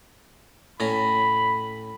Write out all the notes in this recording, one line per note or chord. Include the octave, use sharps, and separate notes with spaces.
A2 C#4 A#5 B5